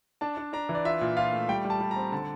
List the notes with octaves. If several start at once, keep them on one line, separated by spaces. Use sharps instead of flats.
D4 A5
D4
D4 A#5
E3
D5
F4 E5
A#2
F4 F5
A3
G3 G5
G3
A5
G3
A#5
C4
D3 A5